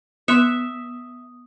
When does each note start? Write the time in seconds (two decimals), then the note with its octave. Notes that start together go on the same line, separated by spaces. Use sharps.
0.28 B3 E5 C6 D6 D#6 F#6 C#7